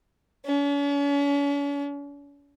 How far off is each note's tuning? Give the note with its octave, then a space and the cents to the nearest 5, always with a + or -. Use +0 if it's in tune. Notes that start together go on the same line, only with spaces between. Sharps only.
C#4 +45